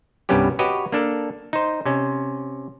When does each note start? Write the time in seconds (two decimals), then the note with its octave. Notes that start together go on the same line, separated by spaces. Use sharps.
0.29 C2 G2 G3 B3 C#4 G4
0.59 F#4 G4 B4 C#5 D#5
0.92 A#3 D4 A4
1.53 D#4 C5
1.85 C3 C#4